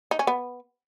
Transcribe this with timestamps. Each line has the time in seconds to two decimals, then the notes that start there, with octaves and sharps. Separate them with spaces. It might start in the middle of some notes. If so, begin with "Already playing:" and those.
0.11 D#4
0.19 C#4
0.27 B3